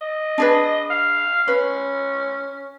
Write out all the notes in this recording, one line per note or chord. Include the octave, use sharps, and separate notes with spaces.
D#5
D4 G#4 B4
F5
C#4 B4